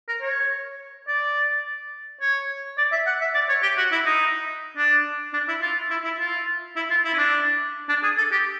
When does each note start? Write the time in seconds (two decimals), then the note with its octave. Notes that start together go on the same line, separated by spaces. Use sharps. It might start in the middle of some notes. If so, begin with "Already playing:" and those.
0.08 A#4
0.22 C#5
1.08 D5
2.21 C#5
2.78 D5
2.92 E5
3.06 F#5
3.21 E5
3.35 D5
3.49 C#5
3.63 G4
3.78 F#4
3.92 E4
4.06 D#4
4.77 D4
5.33 D4
5.48 E4
5.62 F4
5.90 E4
6.04 E4
6.19 F4
6.76 E4
6.90 F4
7.05 E4
7.14 C#4
7.18 D4
7.89 D4
8.03 G#4
8.18 A4
8.32 G4